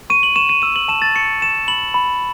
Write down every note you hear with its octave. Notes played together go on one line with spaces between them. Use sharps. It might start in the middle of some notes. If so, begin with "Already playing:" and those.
C#6 D#7
F#7
C#6 E7
D#7
E6 D#7
F#7
A5 E7
A6
C#6 C#7
A5 E7
B5 F#7
B5